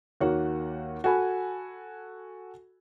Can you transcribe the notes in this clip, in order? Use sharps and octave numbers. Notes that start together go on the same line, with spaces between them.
D#2 A#3 F#4 C#5 F#5
F#4 A4 G#5 B5